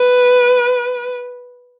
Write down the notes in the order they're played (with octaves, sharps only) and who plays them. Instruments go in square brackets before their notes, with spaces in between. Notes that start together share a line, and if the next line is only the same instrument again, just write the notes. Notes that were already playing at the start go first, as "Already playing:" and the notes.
Already playing: [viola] B4